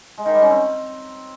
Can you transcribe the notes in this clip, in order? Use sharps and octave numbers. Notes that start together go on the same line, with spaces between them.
G#3
D#3
G3
C#4
C4